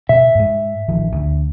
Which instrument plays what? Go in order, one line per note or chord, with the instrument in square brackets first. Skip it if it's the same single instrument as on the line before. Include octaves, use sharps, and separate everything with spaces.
[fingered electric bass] B2 [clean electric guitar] E5
[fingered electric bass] G#2 G#3
A1 D#3 F3
D2